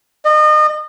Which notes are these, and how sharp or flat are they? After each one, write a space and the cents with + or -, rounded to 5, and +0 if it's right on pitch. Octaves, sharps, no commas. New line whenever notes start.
D#5 -35